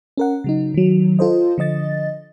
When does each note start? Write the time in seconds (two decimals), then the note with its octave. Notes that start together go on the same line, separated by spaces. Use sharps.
0.17 C#4 A#4 F#5
0.44 C#3 F#3 D#4
0.74 D#3 F#3
1.19 F4 A4 C5 D#5
1.58 D3 F3 D#5 A6